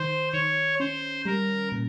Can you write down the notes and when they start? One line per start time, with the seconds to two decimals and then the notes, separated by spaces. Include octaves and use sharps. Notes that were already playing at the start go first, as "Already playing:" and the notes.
Already playing: D#3 C5
0.33 D#3 C#5
0.80 C#4 C5
1.25 G3 A#4
1.72 A#2